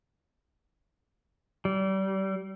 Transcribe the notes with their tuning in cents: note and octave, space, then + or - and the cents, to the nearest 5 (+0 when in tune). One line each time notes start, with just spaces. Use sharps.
G3 -30